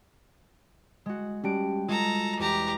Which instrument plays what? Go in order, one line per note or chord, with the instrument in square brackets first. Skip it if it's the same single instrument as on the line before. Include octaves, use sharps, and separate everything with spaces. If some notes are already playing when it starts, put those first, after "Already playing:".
[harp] G#3 F#4
[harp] G3 F#4 D7 [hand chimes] C#4 G4 A5
[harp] G#3 [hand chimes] F4 [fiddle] A4 A#5
[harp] E2 [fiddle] G4 A#5